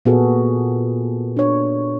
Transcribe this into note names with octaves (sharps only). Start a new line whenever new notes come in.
A#2 B3 F#4 G#4 A4
D4 C#5